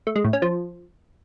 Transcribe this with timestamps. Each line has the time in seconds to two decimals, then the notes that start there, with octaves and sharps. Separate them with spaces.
0.07 A3
0.16 G#3
0.24 A2
0.33 C#4
0.42 F3